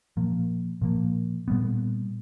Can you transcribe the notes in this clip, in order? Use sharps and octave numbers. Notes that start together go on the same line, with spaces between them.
A#2 F3 A#3
A#2 F3 A#3
A#2 G3 B3